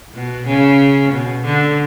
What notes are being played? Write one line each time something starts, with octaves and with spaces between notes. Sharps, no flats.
B2
C#3
B2
D3